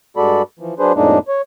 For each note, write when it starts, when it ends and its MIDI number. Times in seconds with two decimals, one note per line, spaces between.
0.17 0.42 43
0.17 0.42 56
0.17 0.42 66
0.17 0.42 69
0.17 0.42 74
0.17 0.42 83
0.59 0.74 52
0.59 0.74 53
0.79 0.93 54
0.79 0.93 62
0.79 0.93 68
0.79 0.93 71
0.79 0.93 72
0.95 1.19 41
0.95 1.19 45
0.95 1.19 56
0.95 1.19 58
0.95 1.19 62
0.95 1.19 63
1.28 1.42 73